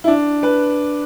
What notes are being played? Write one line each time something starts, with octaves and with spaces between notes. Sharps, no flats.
E4
D4
B4